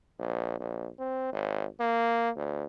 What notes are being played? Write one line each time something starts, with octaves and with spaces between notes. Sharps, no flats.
A#1
A#1
C4
G#1
A#3
D2